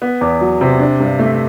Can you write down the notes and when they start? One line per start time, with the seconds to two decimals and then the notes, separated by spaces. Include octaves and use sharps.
0.02 B3
0.21 E2
0.41 F#3
0.61 C3
0.79 D4
1.00 G2
1.19 A3